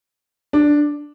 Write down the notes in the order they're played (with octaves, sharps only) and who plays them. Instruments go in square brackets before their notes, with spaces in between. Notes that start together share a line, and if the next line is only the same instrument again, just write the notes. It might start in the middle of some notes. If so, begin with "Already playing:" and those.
[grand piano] D4